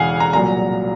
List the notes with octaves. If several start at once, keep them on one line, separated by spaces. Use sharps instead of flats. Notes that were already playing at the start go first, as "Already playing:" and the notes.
Already playing: E1 E2 C#3 E3 F5 F#5 G#5
A#5
C2 A#2 F#3 A#5